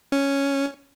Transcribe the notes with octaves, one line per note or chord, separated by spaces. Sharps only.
C#4